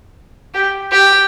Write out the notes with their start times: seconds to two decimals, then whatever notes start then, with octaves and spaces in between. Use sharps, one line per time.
0.54 G4
0.92 G4